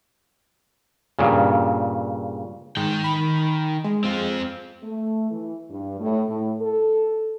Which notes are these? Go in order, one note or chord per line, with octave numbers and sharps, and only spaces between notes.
G2 A#2 C#3
G#2 D#3 G5
B5
G#3
C4 F4
A3
E3
G2
A2
A2
A4